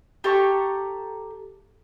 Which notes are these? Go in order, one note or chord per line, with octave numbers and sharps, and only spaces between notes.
G4 A4 A#5 C#6